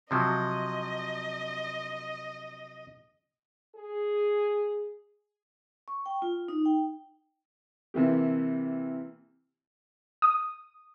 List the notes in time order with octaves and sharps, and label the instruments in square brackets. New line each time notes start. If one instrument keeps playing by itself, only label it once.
[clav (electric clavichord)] C3 F3 F#3 [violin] D#5
[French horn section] G#4
[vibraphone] C#6
G5
F4
D#4
G5
[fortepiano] C3 E3 A#3 G4
[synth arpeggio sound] D#6